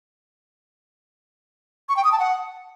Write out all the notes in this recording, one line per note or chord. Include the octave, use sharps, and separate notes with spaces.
C#6
G5
D#6
A5
F#5